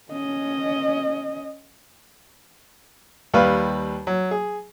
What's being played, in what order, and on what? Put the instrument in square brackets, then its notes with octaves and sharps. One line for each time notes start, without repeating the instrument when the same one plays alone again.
[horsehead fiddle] C#4 D#5
[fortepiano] D#2 G3 B4 F5
F#3
G#4